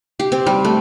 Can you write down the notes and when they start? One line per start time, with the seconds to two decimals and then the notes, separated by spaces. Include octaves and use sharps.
0.20 G4
0.32 C4
0.47 G3
0.65 A3